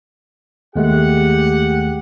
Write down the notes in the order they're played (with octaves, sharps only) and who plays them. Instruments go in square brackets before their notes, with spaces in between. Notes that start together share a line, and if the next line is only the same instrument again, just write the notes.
[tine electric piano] D#2 G#3 A3 [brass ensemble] G4 F#5